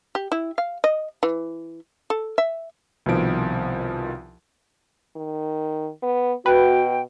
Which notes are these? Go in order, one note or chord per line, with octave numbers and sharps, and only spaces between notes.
G4
E4
F5
D#5
E3
A4
E5
C2 B2 D#3 F3 D7
D#3
B3
B2 F#4 B4 G5